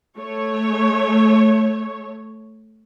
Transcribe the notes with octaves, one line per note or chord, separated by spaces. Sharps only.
A3 C#5